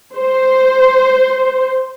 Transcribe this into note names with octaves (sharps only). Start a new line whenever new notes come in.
C5